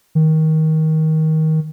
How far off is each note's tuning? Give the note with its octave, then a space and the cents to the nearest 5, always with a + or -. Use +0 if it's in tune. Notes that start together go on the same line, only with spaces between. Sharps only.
D#3 +20